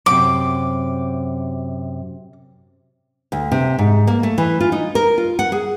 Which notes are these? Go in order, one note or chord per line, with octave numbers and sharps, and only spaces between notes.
F#2 C3 D6
D2
C3
G#2
A#3
A3
E3
F4
D#4
A#4
F4
F#5
G#4